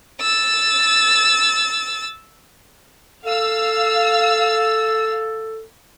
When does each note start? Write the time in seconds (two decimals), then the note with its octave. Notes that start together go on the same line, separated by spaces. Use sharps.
0.21 E6 A6
3.25 A4 F5 E6